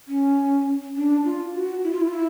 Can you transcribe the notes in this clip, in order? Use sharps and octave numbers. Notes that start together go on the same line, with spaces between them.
C#4
D4
F4
F#4
E4
F4
E4
F4
E4